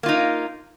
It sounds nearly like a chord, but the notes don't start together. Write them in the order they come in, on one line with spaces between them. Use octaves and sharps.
A#3 F4 D#4